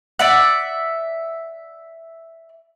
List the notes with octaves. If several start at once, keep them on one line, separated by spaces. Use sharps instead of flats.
D5 E5 F#5